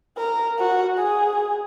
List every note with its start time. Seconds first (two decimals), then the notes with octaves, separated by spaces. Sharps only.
0.18 A#4
0.58 F#4
0.98 G#4